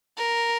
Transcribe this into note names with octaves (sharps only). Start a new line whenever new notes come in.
A#4